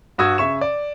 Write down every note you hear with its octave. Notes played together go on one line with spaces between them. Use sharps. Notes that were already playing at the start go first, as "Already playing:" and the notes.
G2 F#4 D#6 E6 G#6
C#3 E5 C#6 E7
D5